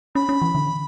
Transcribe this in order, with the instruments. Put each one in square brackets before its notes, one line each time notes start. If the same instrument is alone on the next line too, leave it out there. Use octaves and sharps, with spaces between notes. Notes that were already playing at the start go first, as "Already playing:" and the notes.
[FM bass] C#4 [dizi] B5
[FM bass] C#4
E3
D3